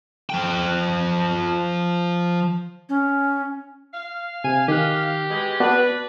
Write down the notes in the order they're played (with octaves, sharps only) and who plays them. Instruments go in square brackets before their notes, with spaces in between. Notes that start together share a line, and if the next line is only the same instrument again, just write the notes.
[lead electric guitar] F3 G5
[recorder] C#4
[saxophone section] F5
[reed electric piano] C3 [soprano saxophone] G#5
[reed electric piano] D#3 F#6 [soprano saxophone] G4
[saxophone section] B2 G#3
[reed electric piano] B3 F#4 D5 [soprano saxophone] D4 [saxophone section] B4